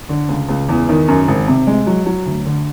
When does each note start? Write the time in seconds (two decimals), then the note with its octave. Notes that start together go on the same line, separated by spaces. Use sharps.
0.09 D3
0.28 C#2
0.48 C#2
0.69 E2
0.89 D#3
1.08 F#2
1.28 G#1
1.48 C3
1.67 G#3
1.87 F#3
2.06 F#3
2.26 D2
2.46 D3